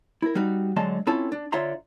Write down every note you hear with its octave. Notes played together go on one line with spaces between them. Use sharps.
E4 A#4
G3 D#4 F#4
D3 F#3 G#3 D#5 A5 C6
C4 C#4 E4 F4 A4 A5
D4
D3 F4 C#5 E5 A#5 C6